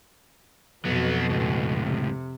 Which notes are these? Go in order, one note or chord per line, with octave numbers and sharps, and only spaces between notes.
F2 B2 F#3 B3
C#2 A2
C3